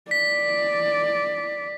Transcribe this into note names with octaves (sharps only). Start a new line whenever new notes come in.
D5 B6